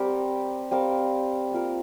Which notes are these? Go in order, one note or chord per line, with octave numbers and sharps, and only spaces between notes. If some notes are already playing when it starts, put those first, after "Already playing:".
Already playing: G3 C4 G4 A#4
G3 C4 A#4 F5
A#3 F4 A#4